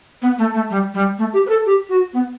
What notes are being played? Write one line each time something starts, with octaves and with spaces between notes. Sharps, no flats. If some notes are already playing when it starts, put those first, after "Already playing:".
B3
A3
A3
G3
G3
A3
G4
B4
A4
G4
F#4
B3